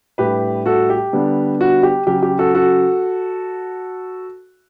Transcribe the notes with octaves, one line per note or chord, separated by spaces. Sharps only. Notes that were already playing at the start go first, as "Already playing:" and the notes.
A2 G3 D4 G4 B4
F#4 A4
G4
D3 G3 B3 D4
F#4
G4
C#3 F#3 C#4 G4
G4
F#4 A4
F#4 A4